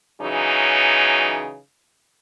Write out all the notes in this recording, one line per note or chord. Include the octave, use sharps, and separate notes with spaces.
C#3 E3 F#3 D#4